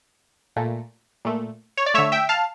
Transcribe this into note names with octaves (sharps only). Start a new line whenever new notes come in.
A#2 A3
A#2 A3
C#5
D5
D3 A3 C#5 E5
E5 G5
F5 A5